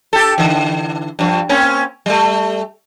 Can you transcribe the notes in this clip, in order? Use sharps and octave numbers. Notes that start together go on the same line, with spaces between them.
G4 A4
D3 E3
G2 F3
A#3 C4 C#4
G3 A3